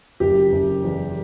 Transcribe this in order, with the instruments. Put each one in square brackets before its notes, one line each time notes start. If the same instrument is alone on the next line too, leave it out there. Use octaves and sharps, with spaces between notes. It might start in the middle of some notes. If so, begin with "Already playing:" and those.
[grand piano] F#1 G4
F#1
E2